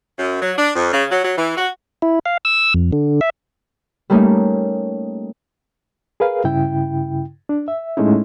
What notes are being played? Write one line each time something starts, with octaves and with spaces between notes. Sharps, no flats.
F#2
F#3
D4
F2
C#3
F#3
F#3
E3
F#4
E4
F5
E6
F2
D3
E5
G3 A3 A#3 C#4 D#4
G#4 A#4 B4 F5
G2 C#3 E4 G5
D4
E5
A2 G#3 A3 C#4 D#4 E4